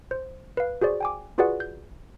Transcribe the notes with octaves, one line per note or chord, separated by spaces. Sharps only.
C5
B4 F5
F#4 G#4 C5 D5
G5 G#5 D6
F4 F#4 G#4 B4 D5 F#5
G6